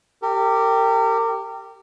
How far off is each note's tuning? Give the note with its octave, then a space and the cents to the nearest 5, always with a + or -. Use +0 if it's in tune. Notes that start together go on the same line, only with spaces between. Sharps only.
G4 +0 A#4 -35